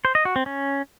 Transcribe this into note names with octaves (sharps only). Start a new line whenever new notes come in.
C5
D#5
F#4
C4
C#4